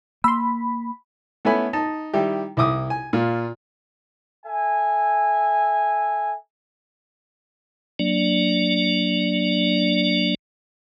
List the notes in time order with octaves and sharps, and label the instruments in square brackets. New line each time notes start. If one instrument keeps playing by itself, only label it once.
[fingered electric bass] A#3 [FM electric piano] B5 [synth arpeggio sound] C6 E6
[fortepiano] A3 B3 C#4 E4 G#5 B5
D#4 A5
D#3 G3 E4 G4
C2 E4 D6 D#6
G#5
A#2 F4
[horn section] A4 E5 G#5
[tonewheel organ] F#3 A#3 D4 D5